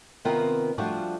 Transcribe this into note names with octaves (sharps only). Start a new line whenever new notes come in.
C3 D#3 B3 C4 F4 A#4
F3 G3 A3 D4 F4 F#4